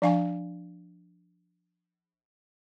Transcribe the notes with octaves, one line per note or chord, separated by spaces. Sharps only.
F3 D4 F5 G#5 C#6